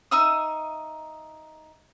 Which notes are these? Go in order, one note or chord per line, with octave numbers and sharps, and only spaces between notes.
D#4 E5 D#6